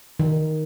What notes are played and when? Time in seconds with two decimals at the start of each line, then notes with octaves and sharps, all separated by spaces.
0.20 D#3